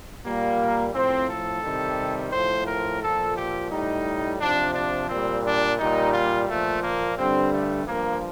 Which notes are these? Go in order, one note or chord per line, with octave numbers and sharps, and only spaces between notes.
A#2 G3 A#3
A2 F3 C4
A4
C3 D#3 G3
A2 F3 C5
A#4
A#2 F3 A4
G4
A2 G3 D#4
C3 F3 D4
D4
A#2 G3 C4
D4
A#2 G3 D#4
F4
A#2 F3 A3
A#3
G2 D3 G3 C4
A3
G2 F3 A#3